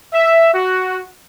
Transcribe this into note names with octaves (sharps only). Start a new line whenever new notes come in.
E5
F#4